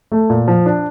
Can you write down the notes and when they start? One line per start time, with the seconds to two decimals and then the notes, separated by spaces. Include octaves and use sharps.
0.12 A3
0.30 A#2
0.48 F3
0.66 D4